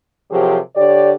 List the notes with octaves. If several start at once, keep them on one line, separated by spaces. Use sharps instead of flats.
C3 F3 F#3 G4 G#4 A#4
D3 G4 C#5 D5